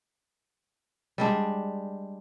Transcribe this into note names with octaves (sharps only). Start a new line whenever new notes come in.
G3 G#3 D4